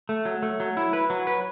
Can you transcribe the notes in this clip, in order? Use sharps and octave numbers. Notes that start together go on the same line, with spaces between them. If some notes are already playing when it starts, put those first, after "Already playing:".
A3
F#3
A3
F#3
E4
B4
F#3
B4